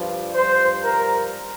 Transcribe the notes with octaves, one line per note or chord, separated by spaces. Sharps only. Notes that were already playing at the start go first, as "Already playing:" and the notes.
Already playing: G2 F3
G2 F3 C5
A#4